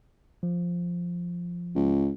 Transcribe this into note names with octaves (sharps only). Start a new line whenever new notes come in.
F3
C#2